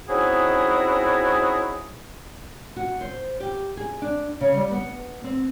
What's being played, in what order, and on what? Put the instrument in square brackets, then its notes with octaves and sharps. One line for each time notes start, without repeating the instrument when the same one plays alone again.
[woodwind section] C4 C#4 D#4 E4 F#4 G#4
[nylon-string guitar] F#4
C5
G4
G#4
D4
C#3
G3
B3
C4